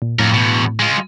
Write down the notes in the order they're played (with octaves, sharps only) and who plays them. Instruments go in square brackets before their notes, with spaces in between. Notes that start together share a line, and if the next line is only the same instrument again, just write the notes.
[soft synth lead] A#2
[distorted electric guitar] F2 A#4 [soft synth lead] A2
[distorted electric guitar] E2 B2
G#3 F4